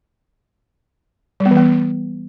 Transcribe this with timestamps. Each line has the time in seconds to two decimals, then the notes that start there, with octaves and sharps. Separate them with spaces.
1.40 G3
1.46 B3
1.51 E3
1.57 B3